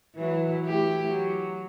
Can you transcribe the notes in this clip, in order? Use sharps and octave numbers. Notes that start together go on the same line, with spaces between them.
E3 F#3 E4
A3 E4 G4
F#3